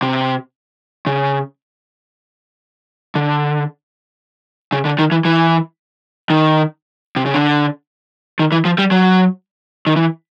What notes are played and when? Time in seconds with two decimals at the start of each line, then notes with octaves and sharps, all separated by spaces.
0.02 C3
1.07 C#3
3.15 D3
4.72 C#3
4.85 D3
4.99 D#3
5.12 E3
5.25 E3
6.30 D#3
7.16 C3
7.26 C#3
7.34 D3
8.39 D#3
8.52 E3
8.65 F3
8.78 G3
8.91 F#3
9.87 D#3
9.96 E3